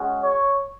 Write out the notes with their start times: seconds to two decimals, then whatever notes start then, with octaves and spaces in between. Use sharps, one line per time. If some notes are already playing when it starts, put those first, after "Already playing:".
Already playing: G#3 C#4 F#4
0.24 C#5